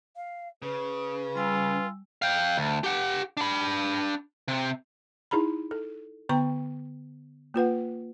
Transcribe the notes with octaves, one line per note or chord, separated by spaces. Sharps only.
F5
C#3 B4
G3 F4 G#5 E6
F5 G5
D2
G4 F#5
D4 B5
C3
D#4 E4 G#4 A#5 B5
A4
D3 B3 G5 A#5 C#6
A#3 F4 B4 F#5